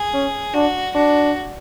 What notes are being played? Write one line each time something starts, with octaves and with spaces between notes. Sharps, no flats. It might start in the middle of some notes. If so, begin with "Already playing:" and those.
Already playing: G#4
C#4
D4 F#4
D4 F#4